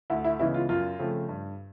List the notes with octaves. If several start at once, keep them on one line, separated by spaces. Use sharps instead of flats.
D2 E4
E4
C#3 E3 G#3 B3 E4
F4
F#2 F4
C#3 F3 A3 C4
G2